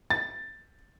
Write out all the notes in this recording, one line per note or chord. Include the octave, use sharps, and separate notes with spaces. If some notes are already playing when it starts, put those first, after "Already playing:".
A6